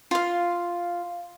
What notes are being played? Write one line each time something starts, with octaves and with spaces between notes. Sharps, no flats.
F4 F5